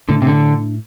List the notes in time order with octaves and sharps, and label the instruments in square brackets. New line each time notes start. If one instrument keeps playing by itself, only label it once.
[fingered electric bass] A2 A3 D4 [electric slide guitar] D3
[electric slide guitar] C3
D3